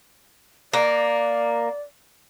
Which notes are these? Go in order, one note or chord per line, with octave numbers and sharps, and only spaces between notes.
A#3 D5